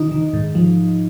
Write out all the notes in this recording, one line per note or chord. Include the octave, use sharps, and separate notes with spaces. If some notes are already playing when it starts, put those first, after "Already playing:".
Already playing: D#3 D#4
D#3
G#2
F3